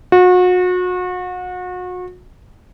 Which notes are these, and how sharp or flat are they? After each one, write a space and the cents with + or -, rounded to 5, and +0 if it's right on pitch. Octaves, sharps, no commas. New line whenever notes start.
F#4 -35